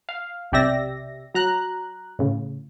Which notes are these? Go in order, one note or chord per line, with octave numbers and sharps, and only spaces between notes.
F5
B1 C3 G4 D5 E5 A#6
F#3 A#5 F#6
A2 C#3